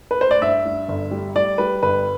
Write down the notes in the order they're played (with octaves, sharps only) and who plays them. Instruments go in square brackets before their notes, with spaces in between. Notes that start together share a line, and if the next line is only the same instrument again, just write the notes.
[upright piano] B4
C5
D5
G2 E5
G2
G1
G3
G3 D5
G3 B4
G1 B4